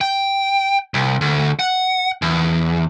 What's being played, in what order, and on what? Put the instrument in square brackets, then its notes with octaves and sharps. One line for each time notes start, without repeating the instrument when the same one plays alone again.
[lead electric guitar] G5
C2
D2
F#5
E2